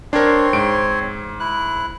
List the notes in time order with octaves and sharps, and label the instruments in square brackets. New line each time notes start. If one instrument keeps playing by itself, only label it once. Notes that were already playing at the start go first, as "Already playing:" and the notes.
[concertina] C4 C#5 C6 [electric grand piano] D4 A#4
[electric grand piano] G#2 D7
[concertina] E4 F#6